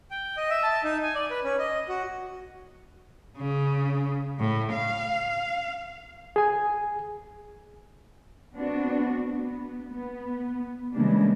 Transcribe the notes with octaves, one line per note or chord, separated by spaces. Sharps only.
G5
D#5
E5
A5
D#4
G#5
D5
B4
C#4
D#5
F#4
C#3
A2
F5
G#4 G#5
B3 C4 D4 F#4
B3
B3
C#3 E3 G3 G#3 A#3 D4